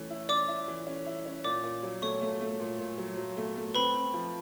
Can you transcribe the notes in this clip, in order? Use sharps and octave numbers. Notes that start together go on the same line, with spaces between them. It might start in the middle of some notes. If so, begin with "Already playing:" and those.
Already playing: E3 A3 C#4
E4
C#4 D5 D6
E4
E3
C#4
E4
C#4
A#2 D5 D6
A#2
F#3
A3 C#5 C#6
A3
A3
A#2
A#2
F#3
F#3
A3
A3
C4 B4 B5
C4
F3